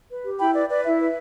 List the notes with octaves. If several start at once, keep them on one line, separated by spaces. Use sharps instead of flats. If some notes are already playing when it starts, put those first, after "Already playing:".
B4
G4
E4 G5 B5
B4 D5
B4 D5
E4 E5
B4